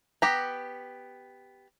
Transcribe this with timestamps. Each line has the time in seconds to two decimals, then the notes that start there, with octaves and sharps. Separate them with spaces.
0.22 B3 G4 A#5